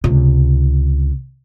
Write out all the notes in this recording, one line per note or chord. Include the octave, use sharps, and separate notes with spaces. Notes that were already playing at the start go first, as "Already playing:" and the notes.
C#2 C3